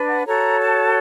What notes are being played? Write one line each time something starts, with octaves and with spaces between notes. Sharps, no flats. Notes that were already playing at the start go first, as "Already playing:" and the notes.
Already playing: D4 B4
F#5
F#4 A4 C#5 A#5
A5